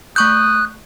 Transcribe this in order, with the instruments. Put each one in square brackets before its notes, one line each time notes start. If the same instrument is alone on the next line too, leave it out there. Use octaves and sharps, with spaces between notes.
[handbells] A3 C#6 G6 [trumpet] D#6 [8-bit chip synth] F#6